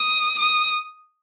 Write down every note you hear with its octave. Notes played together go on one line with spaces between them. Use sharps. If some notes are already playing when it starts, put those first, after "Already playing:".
Already playing: D#6
D#6